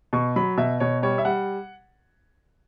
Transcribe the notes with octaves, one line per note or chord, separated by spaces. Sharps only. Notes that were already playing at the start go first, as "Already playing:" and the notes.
B2 C#6
F#3 B5
B2 E5
B2 C#5
G3 C#5
E5
G3 F#5